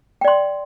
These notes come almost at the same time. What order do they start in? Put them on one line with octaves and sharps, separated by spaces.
G5 D5 C6